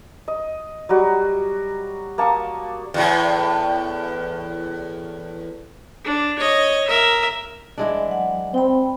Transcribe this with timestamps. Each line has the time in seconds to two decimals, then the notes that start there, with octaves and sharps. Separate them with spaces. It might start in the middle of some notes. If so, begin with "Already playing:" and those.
0.28 D#5
0.89 F#3 G3 F#4
2.18 A#3 A5 C#6 D#6
2.94 E2 A2
6.05 D4
6.39 C#5 D#5
6.88 A#4 E5
7.78 E3 G#3 D4
8.08 F#3 F#5
8.54 C4 G5 B5